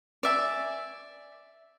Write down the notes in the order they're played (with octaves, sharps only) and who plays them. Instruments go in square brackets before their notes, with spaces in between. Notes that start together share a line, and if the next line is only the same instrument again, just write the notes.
[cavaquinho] D5 E5 G#5